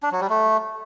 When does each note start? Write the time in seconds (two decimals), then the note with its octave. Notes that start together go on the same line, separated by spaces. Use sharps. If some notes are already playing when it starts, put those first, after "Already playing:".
0.03 D4
0.12 F#3
0.21 G3
0.30 A3